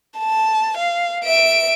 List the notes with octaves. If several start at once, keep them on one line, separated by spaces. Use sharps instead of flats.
A5
F5
E5 D7